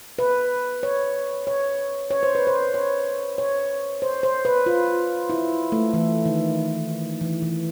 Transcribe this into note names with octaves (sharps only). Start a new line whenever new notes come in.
B4
C#5
C#5
C#5
C5
B4
C5
C#5
C#5
C5
C5
B4
F4
E4
A3
E3
D#3
E3
E3